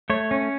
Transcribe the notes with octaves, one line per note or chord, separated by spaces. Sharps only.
A3 C#5
C#4